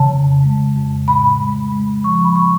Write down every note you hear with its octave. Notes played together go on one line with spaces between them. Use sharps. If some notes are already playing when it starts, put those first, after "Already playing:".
Already playing: C#3 A5
F2
G#3
F2
A2 B5
G#3
G#3 B5
F3 C#6
B5
C#6